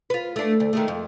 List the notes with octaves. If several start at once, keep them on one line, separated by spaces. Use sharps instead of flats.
F4 B4
A3 D4
D2
D#3 G#3 A3
F2